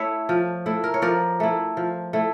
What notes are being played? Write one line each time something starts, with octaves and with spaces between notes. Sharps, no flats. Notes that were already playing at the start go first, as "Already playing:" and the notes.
Already playing: A3 E4 C#5 E5
F3
A3 E4
A#4
C#5
F3 A#4 D5
A3 E4
F3
A3 E4